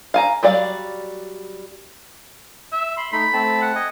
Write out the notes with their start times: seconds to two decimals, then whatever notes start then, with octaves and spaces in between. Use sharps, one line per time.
0.14 F5 G#5 A#5
0.43 F#3 G3 D5 F5
2.72 E5
2.97 B5 C6
3.12 A3 D#4 B5
3.33 A3 C4 A5
3.62 F#5
3.76 D#5 G#5